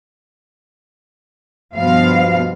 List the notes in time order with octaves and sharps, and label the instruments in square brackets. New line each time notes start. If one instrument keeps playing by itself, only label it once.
[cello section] G2 B2 F3 F5